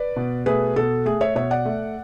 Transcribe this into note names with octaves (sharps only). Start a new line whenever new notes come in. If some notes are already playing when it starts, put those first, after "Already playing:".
Already playing: B4 D5
B2
A3 G#4 B4
B2 A4
A3 G#4
C#5 E5
B2 C#5 E5
D5 F#5
A3